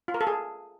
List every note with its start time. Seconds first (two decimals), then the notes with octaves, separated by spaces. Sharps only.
0.08 F4
0.14 A#4
0.21 A4
0.27 G#4